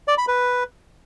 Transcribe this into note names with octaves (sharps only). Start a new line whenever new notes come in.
D5
B5
B4